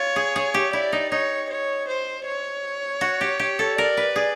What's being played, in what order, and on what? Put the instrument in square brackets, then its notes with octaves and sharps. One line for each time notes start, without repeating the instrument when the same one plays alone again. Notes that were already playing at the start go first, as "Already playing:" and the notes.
Already playing: [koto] F4 [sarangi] C#5
[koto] G#4
G#4
G4
[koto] E4 [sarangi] D5
[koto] D#4
[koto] D#4 [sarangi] C#5
[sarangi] C#5
C5
C#5
[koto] F#4
G4
G4
A4
[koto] A#4 [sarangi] D5
[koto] B4
G#4